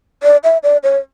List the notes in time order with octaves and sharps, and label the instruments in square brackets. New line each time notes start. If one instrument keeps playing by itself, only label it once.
[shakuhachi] D5
E5
D5
C#5